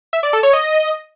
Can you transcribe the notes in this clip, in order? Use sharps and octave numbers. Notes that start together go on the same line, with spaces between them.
E5
D5
A4
C#5
D#5